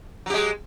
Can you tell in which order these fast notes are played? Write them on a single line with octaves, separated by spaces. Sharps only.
F#3 G4 G#3